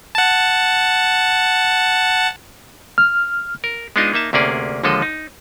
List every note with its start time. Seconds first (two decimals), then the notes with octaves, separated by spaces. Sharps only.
0.15 F#5 A5
2.98 F6
3.64 A#4
3.96 G#3 B3 D4 D#4 F4 D#5
4.13 A#3 D#4 E5 A5
4.33 D2 C3 A#3 C#4 G#4 D5
4.83 D#2 D3 F3 G#3 A4 D#5
5.02 D#4